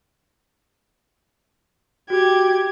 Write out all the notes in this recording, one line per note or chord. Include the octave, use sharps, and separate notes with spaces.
F#4 G4 G#6